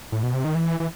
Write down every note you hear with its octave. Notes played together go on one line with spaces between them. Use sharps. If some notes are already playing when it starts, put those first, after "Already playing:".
A2
B2
C3
D#3
E3
E3